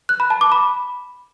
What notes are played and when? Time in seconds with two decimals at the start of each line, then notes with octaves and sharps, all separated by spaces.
0.09 F#6
0.20 B5
0.30 A5
0.41 D6
0.52 B5